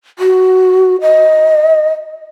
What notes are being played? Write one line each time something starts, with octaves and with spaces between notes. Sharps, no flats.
F#4
D#5